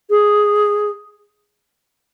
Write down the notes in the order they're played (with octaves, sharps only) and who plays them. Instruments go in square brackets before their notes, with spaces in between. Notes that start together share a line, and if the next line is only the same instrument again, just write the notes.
[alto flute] G#4